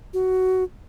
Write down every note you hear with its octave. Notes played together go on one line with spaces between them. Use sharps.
F#4